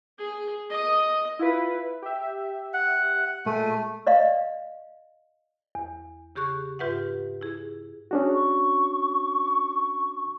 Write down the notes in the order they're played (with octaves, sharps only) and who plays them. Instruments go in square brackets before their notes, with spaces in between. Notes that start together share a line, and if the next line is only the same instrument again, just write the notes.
[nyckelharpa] G#4
D#5 D#6
[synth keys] E4 F4 B4
G4 E5
[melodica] F#5
[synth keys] A#2 G#3 D#7 [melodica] A3
[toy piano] D5 D#5 F5
[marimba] E2
C#3 G4 G#4 C#6 F#6
G#2 F4 G4 B4 E5 F#5
E4 G#4
[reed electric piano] C#4 D4 F#4 [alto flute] G#4
[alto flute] C#6